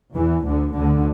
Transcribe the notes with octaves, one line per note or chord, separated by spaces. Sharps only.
E2 E3
D2 D3
D2 D3